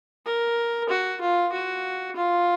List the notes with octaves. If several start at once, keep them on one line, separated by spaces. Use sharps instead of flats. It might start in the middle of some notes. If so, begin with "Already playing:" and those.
A#4
F#4
F4
F#4
F4